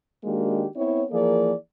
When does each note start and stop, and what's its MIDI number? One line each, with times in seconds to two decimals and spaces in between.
0.24 0.66 51
0.24 0.66 56
0.24 0.66 58
0.24 0.66 62
0.24 0.66 66
0.24 0.66 67
0.76 1.03 59
0.76 1.03 60
0.76 1.03 64
0.76 1.03 73
1.11 1.52 52
1.11 1.52 53
1.11 1.52 58
1.11 1.52 68
1.11 1.52 70
1.11 1.52 74